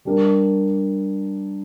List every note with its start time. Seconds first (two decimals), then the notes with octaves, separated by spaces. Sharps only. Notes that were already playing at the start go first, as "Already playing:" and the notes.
0.05 G3 D4 G4 A#4